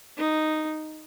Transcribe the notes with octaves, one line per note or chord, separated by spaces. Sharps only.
D#4